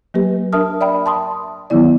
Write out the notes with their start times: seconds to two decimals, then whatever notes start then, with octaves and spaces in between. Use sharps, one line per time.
0.14 F#3 A#3 G4 B4
0.53 D4 A#4 E5 A5 D#6 F6
0.81 D5 E5 G5 B5
1.06 A5 C6 D#6
1.70 D#3 F#3 B3 E4 D5